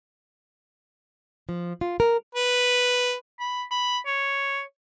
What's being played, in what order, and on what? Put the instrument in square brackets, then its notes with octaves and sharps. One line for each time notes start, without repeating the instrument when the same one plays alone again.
[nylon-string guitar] F3
F4
A#4
[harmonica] B4
[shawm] B5
B5
C#5